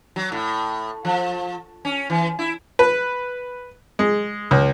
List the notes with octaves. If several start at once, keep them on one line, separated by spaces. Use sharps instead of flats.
F#3
A2
F3
C#4
E3
E4
B4
G#3
C#2